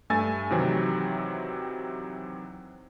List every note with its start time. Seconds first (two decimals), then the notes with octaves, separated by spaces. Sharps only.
0.10 G2 A3 G#5 E6 A6
0.50 C3 D#3 E3 F#3 C4